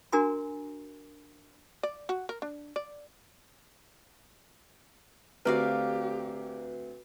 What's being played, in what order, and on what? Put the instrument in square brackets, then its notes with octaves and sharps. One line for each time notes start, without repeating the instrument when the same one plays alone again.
[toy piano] D4 F#4 A#4 G#5 A#5 C6
[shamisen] D5
F#4
A#4
D4
D5
[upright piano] D2 C4 [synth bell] F#4 B4 [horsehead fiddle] G4 [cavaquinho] A#4 D5 F5